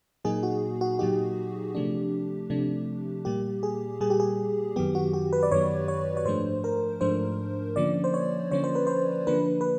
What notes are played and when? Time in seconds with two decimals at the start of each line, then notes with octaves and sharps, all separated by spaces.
0.25 A#2 F#3 A#3 D#4 G#4
0.43 F#4
0.81 F#4
0.99 A#2 F#3 A#3 D#4 G4
1.75 C3 F3 A3 D4
2.50 C3 F3 A3 D4
3.25 A#2 G3 A#3 G4
3.63 G#4
4.01 A#2 G3 A#3 G#4
4.10 G4
4.20 G#4
4.76 F#2 D#3 F#3 B3 G4
4.95 F#4
5.13 G4
5.33 B4
5.43 D5
5.51 F#2 D#3 F#3 B3 C#5
5.88 C#5
6.17 C#5
6.25 G#2 F3 A3 D4 C5
6.64 A#4
7.01 G#2 F3 A3 D4 C5
7.76 D3 F3 A#3 C#4 D5
8.04 C5
8.14 C#5
8.51 D3 F3 A#3 C#4 C#5
8.64 C5
8.75 B4
8.87 C5
9.27 D3 F3 A#3 D4 B4
9.61 B4